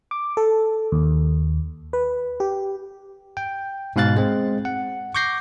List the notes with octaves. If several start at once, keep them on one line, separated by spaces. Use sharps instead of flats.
D6
A4
D#2
B4
G4
G5
G#2 B2 F5 F#6 A6
G#3 C4
F#5
C#6 D6 G6 A#6 C7